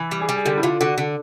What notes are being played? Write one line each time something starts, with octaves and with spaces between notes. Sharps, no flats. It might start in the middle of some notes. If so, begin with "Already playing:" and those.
Already playing: E3
G3
G#4
G3
G#4
D3 G4
E4
D3 F4
D3 F#4
D3 A4